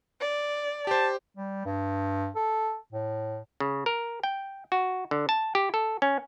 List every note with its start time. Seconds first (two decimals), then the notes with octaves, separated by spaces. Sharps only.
0.21 D5
0.87 G4 C5 A5
1.37 G3
1.65 G2
2.36 A4
2.93 A2
3.60 C#3
3.86 A#4
4.23 G5
4.72 F#4
5.11 D3
5.29 A5
5.55 G4
5.74 A4
6.02 C#4